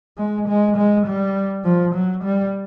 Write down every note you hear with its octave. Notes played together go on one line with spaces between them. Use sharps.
G#3
G#3
G#3
G3
F3
F#3
G3